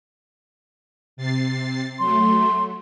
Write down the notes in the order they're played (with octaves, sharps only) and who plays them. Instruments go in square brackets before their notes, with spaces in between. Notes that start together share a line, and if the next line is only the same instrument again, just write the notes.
[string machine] C3 A6 C7
[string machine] F#3 A3 [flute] C6